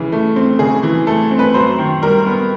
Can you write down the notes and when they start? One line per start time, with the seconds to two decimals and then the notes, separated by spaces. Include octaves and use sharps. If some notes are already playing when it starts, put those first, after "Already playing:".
Already playing: C#3 E3
0.12 A3
0.36 C4
0.59 C#3 G#4
0.83 E3
1.07 A3 A4
1.31 C4
1.39 B4
1.54 F#2 C5
1.78 D#3
2.02 G3 A#4
2.26 B3